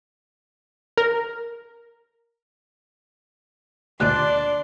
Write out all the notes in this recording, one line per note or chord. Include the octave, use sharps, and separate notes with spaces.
A#4
D2 A#2 D4 D#4 D5 C6 F#6